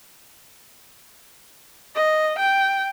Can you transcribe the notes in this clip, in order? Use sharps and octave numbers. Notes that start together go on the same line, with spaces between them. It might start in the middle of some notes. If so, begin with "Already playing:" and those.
D#5
G5